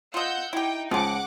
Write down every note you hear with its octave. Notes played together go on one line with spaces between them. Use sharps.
F4 D#5 F#5 E6 G6
D#4 E4 G4 G5
C#2 C#3 F3 F#5 D6